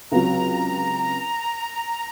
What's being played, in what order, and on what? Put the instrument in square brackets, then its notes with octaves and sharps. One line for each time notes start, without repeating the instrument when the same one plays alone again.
[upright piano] C#2 C3 F#3 [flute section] A#5